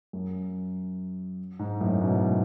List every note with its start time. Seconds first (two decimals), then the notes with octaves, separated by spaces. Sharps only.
0.13 F#2
1.59 G#2
1.81 F#2 A2
2.01 G#2 B2